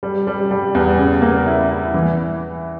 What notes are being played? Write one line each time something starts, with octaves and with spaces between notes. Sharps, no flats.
G3
G3
G3
E2
C#3
A#3
E4
E4
E3